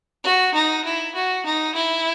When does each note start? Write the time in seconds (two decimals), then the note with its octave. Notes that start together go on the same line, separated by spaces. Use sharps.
0.24 F#4
0.54 D#4
0.85 E4
1.15 F#4
1.46 D#4
1.75 E4